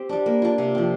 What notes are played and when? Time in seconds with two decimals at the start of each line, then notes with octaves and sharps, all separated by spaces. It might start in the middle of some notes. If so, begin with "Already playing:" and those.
Already playing: C4 G4
0.09 G3 D4
0.26 A#3
0.42 D4 F4
0.58 C3
0.75 F3 C4